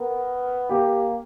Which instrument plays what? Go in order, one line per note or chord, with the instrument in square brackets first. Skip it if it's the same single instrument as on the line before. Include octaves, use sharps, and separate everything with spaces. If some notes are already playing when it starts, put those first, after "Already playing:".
Already playing: [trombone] B3 [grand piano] A#4
[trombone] A#3 [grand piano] G4